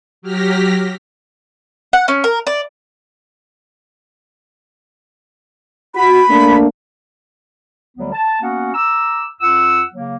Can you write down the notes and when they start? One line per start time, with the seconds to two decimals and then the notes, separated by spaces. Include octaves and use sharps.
0.22 F#3 G4 F6 A#6 B6
1.93 F#5
2.08 C#4
2.24 A#4
2.47 D5
5.95 F#4 B5
6.29 A3 A#3 D4
7.97 D2 D3 F#3 G3 B3
8.12 A5
8.42 A#3 B3 C#4 F#4 F#5
8.75 A#5 D6 E6
9.41 F2 F4 F#5 E6
9.93 C#3 F#3 A#3